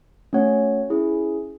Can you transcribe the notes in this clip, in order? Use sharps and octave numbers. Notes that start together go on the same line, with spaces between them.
A3 C#4 F#4 C#5 F#5
C#4 E4 G#4